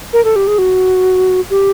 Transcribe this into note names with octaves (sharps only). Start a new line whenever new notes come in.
A#4
A4
G4
G#4
F#4
G4